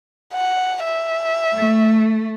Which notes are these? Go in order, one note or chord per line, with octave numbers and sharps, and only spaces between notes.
F#5
E5
A3